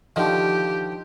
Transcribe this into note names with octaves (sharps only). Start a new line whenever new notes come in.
D3 D#3 F3 G4